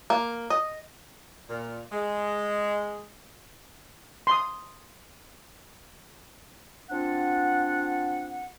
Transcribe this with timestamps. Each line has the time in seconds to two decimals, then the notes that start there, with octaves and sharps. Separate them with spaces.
0.10 A#3
0.50 D#5
1.49 A#2
1.92 G#3
4.27 C6 D#6
6.89 C4 D4 F4 F#5